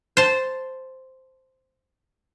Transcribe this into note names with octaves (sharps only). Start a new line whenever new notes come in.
C5 A5